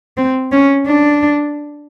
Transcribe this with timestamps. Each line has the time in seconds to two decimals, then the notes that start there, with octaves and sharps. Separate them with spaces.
0.17 C4
0.52 C#4
0.86 D4